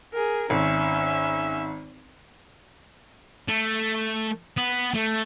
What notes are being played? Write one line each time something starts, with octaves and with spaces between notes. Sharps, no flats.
G#4 A#4
G#1 C#4 E5
A3
B3
A3